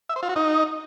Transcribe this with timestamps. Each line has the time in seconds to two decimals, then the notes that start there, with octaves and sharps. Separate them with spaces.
0.09 E5
0.16 C5
0.23 F4
0.29 F#4
0.36 D#4